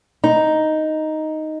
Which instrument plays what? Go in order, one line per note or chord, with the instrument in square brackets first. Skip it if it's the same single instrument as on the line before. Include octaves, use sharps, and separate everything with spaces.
[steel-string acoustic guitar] D#4